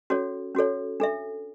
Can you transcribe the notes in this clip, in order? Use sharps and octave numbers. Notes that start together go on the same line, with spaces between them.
C#4 F#4 A4 C#5
C#4 F#4 A4 C#5
D4 A4 E5